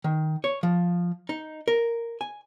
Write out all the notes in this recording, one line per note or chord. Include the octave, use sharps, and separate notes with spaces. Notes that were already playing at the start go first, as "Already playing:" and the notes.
D#3
C#5
F3
D#4
A#4
G#5